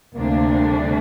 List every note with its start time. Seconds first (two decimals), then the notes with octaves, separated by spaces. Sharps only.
0.15 D2 C3 G3 A#3 D4
0.62 A3